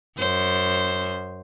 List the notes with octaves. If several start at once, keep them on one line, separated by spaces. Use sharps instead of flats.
F#2 C5